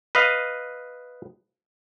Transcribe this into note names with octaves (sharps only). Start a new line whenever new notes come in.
B4 D#5 F5